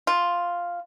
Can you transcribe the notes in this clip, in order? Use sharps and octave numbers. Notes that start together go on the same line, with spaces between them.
F4